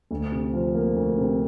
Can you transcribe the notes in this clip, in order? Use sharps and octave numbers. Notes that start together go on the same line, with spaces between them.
D2
C3
F3
A#3
D2
C3